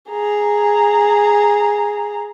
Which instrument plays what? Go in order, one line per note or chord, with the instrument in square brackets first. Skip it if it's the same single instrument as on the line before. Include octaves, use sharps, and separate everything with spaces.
[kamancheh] G#4 A#5